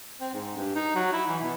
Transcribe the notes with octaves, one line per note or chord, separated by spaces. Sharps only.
C4
G#2
G2
D#4
F#3
E4
E3
B2